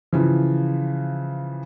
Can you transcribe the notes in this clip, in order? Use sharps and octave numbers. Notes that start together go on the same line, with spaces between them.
C#3 E3 F3